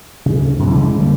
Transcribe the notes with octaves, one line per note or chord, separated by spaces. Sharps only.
C#3
D2
F#2 C3
C#3 E3 F3 G#3
D3 G3 A#3